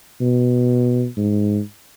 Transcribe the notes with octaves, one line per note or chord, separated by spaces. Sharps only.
B2
G#2